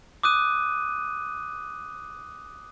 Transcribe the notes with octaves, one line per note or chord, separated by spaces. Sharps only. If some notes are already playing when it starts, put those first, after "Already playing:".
D6 D#6 F#6 D#7